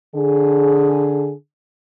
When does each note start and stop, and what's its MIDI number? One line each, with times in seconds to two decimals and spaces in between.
0.15 1.33 50
0.15 1.33 68